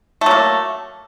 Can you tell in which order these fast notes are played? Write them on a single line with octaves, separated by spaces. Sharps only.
A3 F#3 A#3